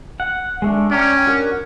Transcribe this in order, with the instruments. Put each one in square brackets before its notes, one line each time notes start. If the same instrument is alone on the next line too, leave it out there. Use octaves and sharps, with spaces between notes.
[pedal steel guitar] F#5
G#3 A3 D4
[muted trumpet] C#4 [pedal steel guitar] D5 G5 A#5
[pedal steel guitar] D4 F#4 A#4